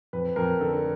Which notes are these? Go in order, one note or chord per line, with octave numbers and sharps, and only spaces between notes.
F2 B4
F2 A#4
D3 A4
A4